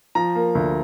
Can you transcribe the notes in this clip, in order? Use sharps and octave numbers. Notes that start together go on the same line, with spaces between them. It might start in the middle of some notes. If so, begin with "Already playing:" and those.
F3 A#5
A#3
D2